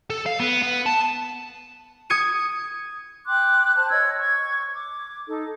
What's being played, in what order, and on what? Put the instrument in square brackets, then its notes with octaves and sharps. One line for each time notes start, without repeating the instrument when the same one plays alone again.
[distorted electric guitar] A4
F5
B3
B3
A5
[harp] D#6 G#6 C#7 D#7
[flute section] G5 C6 D6 F#6
C5 A5 C6 F#6
C#5 D#5 E6 G#6
C#6 G#6
D6
D#4 A4